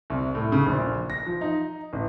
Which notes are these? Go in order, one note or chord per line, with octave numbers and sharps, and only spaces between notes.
C2
A2
C#3
A#1
A#6
F3
D#4
A1